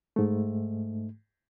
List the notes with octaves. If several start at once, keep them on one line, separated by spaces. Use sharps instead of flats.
G#2 A3